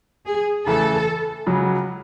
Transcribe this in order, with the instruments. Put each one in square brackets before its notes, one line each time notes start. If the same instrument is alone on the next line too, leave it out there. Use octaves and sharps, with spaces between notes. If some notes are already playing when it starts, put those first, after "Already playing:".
[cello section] G#4
[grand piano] C#3 E3 A3 [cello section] A4
[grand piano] C#2 C#3 F#3